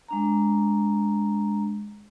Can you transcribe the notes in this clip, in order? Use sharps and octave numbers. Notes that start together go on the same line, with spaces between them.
G#3 D4 A#5